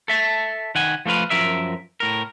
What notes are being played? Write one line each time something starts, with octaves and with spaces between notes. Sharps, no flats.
A4 E5 A5
D#3 F#5 G#5
F3 A3 F4 B4 F5
F#2 F3 A#4 E5
A2 A#4